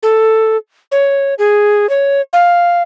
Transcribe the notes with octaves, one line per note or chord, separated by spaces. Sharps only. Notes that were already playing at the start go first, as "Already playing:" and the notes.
A4
C#5
G#4
C#5
F5